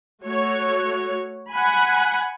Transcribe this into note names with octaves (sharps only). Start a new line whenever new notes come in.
A3 F#4 C#5
F#5 G#5 B5